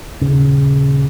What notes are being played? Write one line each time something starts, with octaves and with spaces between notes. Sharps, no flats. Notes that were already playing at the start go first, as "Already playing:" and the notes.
D#1 C#3